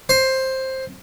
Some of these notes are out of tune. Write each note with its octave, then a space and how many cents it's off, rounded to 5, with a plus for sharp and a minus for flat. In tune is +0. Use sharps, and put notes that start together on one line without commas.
C5 +10